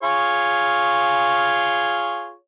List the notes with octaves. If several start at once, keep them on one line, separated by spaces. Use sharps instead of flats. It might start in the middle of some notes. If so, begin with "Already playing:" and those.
F4 G#4 C#5